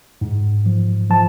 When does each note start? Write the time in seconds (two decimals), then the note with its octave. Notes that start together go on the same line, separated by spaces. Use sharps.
0.21 G#2
0.66 F3
1.10 F3 A5